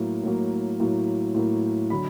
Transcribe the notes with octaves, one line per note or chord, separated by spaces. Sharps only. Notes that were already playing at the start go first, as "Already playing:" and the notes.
Already playing: A2 F#3 A#3
A2 F#3 A#3
A2 F#3 A#3
A2 F#3 A#3
D3 F#3 B5